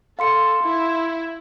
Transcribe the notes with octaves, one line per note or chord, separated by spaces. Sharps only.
A4 F5 C6 C#7
E4